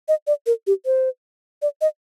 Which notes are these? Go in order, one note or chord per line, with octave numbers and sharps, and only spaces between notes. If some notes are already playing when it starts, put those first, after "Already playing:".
D#5
D5
A#4
G4
C5
D5
D#5